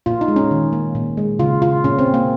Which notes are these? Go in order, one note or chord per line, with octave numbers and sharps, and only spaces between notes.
A#2 F4
D#4
G#3
C#4
D#3
A#3
A#2
G#3
C#3 F4
C#3 F4
A#2 C#4
C4
A#2
A#3